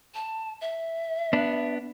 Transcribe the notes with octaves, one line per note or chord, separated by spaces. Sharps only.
A5
E5
B3 D4